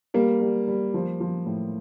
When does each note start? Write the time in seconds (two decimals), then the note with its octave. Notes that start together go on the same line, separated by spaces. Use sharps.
0.14 G3 A#3
0.41 G3
0.68 G3
0.94 F3
1.20 F3
1.46 A2